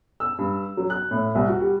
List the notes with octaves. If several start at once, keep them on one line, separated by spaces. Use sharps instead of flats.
E6
G2
F#3
F#6
A2
C2
F#4
G3